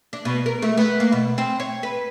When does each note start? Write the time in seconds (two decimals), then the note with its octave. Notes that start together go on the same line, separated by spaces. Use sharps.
0.13 D4
0.25 B2
0.46 A#4
0.62 A3
0.78 B3
1.00 A#3
1.12 B2
1.38 C4
1.60 C#5
1.83 B4